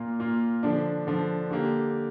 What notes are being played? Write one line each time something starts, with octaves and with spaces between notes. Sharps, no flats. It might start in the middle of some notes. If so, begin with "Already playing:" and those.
Already playing: A#2 A#3 F4
A#2 A#3 F4
D3 F3 D4
D3 F3 D4
D3 A#3 G4